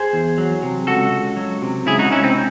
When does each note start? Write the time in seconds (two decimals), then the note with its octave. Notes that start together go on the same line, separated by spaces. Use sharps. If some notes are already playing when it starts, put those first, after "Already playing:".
Already playing: G#4 C5
0.13 E2
0.38 F#3
0.62 C3
0.87 C#2 F#4 A4
1.12 C#2
1.37 F#3
1.62 C3
1.86 C#2 E4 G#4
1.99 D#4 F#4
2.11 C#2 C#4 E4
2.24 C4 D#4